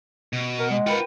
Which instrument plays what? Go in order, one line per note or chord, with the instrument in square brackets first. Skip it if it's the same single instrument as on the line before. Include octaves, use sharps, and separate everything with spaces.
[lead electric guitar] B2
[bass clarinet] A#4 [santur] F#5
[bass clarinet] G#3
[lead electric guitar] F4 F#5 [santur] A#4 B4 G5